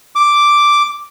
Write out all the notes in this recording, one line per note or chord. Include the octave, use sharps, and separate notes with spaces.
D6